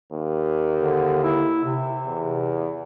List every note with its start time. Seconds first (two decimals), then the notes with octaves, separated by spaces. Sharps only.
0.12 D#2
0.76 D3
1.23 E4
1.64 C3
2.06 E2